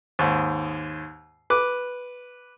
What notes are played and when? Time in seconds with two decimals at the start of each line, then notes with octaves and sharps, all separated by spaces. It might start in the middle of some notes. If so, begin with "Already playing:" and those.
0.19 D#2 G#2
1.50 B4 D6